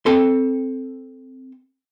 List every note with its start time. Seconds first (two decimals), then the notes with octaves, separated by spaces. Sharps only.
0.06 C4 A4 C6